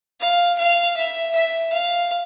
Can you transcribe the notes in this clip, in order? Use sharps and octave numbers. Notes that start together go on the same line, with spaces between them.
F5
F5
E5
E5
F5